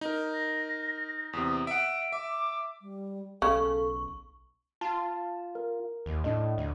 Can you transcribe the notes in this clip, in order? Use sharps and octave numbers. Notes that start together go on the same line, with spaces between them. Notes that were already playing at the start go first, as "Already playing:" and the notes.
D#4 A#4
A#6
E2 C3 D#6
E5 F#5 D7
E5 D6
G3
B1 C#3 A4 C#6
F4 A5
A#4
D#2
A2 D4 D#5
D2